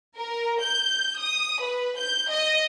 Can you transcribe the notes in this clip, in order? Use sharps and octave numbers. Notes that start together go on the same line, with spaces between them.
A#4
G6
D#6
B4
G6
D#5